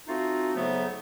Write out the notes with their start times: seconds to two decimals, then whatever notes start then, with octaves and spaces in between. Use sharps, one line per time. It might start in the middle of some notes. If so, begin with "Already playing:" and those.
0.07 F3 A3 C4 D#4 F4 F#4
0.55 F2 G#2 C#3 F#3 A3 B3